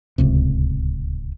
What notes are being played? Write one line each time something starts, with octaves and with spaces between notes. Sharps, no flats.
D1 C#2 C3